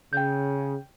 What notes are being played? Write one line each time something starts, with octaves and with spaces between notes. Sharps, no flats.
C#3 G5 G6